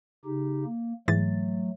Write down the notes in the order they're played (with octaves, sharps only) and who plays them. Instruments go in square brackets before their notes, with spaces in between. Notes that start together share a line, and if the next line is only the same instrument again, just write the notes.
[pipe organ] C#3 D#4 G4
A#3
[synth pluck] G#2 E3 A6 [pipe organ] F#3 A3